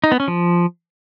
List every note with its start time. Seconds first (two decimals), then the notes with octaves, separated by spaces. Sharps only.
0.04 D#4
0.12 B3
0.20 C#4
0.28 F3